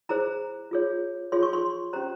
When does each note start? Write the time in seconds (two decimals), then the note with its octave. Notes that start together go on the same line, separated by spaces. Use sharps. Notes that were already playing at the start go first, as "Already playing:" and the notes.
0.09 E4 G#4 C5 A#5
0.71 F4 G#4 C#5
1.32 F4 G#4 C#5 C6
1.43 C#6
1.53 C6
1.93 C#4 G4 C5 A#5